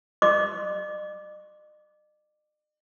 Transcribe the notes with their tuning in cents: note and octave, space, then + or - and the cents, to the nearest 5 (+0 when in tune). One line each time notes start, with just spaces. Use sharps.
D#5 -45 D6 +0